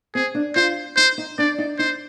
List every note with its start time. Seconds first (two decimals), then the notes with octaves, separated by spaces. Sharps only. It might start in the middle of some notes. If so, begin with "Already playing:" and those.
0.15 C4 G#4
0.35 D4
0.56 F4 C5
0.96 D#4 C5
1.18 D#4
1.38 D4 D5
1.58 D#4
1.78 D#4 C5